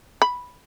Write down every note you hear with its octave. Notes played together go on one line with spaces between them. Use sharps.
B5